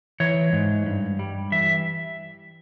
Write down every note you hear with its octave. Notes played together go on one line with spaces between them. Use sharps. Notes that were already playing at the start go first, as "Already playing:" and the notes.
E3 C#5
G#2
G2
G3
E3 E5